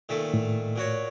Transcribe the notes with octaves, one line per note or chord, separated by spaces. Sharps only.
A#2 D#3 A3
A2
A#2 F#4 C#5